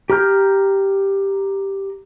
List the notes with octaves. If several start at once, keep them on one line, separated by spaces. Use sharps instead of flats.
G4 A#5 F6 G6